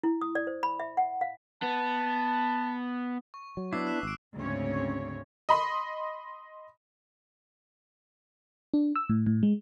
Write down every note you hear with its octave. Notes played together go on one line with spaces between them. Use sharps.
E4
D#6
D5
C5
B5
E5
F#5
F5
B3 A5
C#6
F#3
B3 D4 E4 D6 E6 C7
F#6 E7
G#1 E6 D7
D2 G#2 C#3 C4 C#4 C#5
D#5 B5 C6
D4
E6
A2
A2
G#3